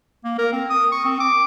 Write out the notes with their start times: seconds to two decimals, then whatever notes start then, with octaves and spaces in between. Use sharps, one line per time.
0.24 A#3
0.38 A#4
0.53 C4
0.70 D#6
0.92 C#6
1.05 C4
1.20 D6